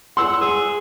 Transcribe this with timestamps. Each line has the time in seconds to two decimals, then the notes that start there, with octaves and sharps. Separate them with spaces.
0.17 F#5 C6 E6
0.41 G#4 E6